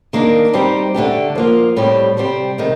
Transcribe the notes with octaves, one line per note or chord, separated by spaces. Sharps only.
D#3 A#3 D4
G3 C4 D#4 G4
D3 A3 D4 G4
F3 A#3 F4
A2 G3 C4 G4
C3 G3 C4 G4
C3 D#3 A3